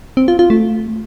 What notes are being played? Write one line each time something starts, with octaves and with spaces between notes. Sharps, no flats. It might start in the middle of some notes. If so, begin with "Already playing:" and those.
C4
F4
F4
A3